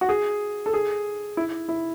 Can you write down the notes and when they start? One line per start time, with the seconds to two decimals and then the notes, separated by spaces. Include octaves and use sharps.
0.01 F#4
0.09 G#4
0.66 A4
0.73 G#4
1.37 E4
1.69 E4